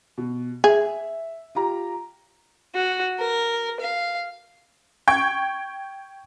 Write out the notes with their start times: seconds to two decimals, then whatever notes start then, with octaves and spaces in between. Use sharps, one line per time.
0.18 B2
0.64 G#4 E5
1.55 F4 G4 A#5
2.75 F#4
3.19 A#4
3.80 F5
5.08 G5 C#6 G#6